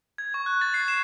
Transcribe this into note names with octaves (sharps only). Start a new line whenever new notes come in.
G#6
C#6
F#6
A6
C7
E7